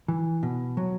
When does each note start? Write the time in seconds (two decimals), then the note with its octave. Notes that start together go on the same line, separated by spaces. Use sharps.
0.08 E3
0.43 B2
0.77 F#3